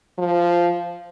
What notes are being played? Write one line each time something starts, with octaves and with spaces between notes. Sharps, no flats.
F3